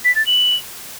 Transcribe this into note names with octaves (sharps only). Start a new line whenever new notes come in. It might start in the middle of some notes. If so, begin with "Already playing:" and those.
B6
A6
F#7